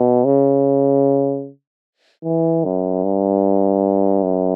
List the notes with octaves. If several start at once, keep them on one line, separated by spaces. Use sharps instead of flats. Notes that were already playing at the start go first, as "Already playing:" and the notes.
Already playing: B2
C#3
E3
F#2
G2
F#2